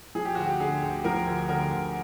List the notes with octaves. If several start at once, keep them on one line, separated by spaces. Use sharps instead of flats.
F3 G#4
G4
D2 F#4
G4
D3 G#4
D2
F3 A#4
D2
D3 A#4
D2